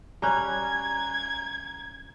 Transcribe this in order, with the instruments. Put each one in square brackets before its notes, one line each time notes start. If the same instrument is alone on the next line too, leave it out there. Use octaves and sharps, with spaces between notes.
[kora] G3 C#4 [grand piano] A#5 F#6 [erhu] G#6